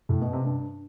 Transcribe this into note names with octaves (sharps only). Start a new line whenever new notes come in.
A2
B2
C3
G2